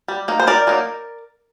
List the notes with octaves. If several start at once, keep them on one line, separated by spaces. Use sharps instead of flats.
G3
A#3 D#4
C5
D#3 A#4 D5
F#3 A#3 D#4